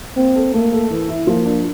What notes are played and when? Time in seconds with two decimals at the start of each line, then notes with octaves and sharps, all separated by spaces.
0.17 A#3 C4
0.36 A4
0.54 A3 A#3
0.72 A4
0.90 E3
1.09 E4
1.27 F3 A#3
1.45 D4